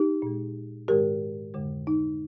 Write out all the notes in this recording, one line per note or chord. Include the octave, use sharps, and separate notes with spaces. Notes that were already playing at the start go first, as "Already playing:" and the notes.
Already playing: D#4 G4
A#2 G#3
G#2 D#3 G#3 G4 A#4
F2 D3 G#3
D#4